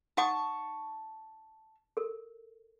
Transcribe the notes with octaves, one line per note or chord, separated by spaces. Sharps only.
D#4 F#5 A5 C#6 D#6
A4 A#4